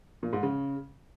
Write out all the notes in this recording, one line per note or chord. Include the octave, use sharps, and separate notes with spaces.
A#2
G#2
C#3